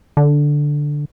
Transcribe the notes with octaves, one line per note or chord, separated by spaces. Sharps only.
D3